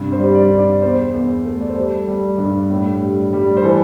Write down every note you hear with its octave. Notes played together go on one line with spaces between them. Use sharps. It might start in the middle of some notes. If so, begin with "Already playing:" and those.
Already playing: G2 C3
C5
G3
D5
G2
D5
E2 C5
E2
A3
D5
C5
G3 A4
G3
G2
A2
G3
G3
C5
E3 A4